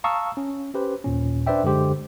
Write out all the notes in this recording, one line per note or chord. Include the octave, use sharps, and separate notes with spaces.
F5 A5 A#5 C#6 D#6 E6
C#4
C#4 G4 B4 C5
D#2 A#2 C#4
D4 B4 C5 D5 E5 G5
F#2 D3 G#3 G4 C5